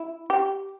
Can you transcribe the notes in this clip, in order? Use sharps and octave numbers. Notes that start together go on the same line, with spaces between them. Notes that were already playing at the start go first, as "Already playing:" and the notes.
Already playing: E4
G4